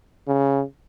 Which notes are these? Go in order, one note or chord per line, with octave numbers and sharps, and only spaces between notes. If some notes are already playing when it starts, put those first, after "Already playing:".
C#3